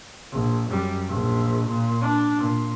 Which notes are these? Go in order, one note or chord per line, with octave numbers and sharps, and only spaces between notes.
A#1
F#2 G3
A#1
A#2
D4
A#2